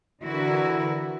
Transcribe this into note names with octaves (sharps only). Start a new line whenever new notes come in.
D3 E3 E4 F#4 A#4